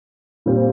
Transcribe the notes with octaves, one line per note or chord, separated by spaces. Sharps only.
A#2 G3 C4